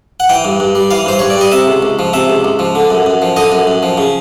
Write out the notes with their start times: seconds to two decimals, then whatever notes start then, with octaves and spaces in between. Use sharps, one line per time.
0.20 F#5
0.29 E3 G5
0.45 G2
0.60 G2
0.75 G3
0.91 E3 F5
1.06 G2 C5
1.19 G2 C#5
1.30 D5
1.37 G3 D#5
1.52 C3 E5
1.68 C#2
1.82 C#2
1.99 F3
2.13 C3 E5
2.30 C#2
2.45 C#2
2.59 F3
2.75 D3
2.90 F#2
3.06 F#2
3.22 F3
3.37 D3 D#5
3.52 F#2
3.67 F#2
3.83 F3
3.98 C#3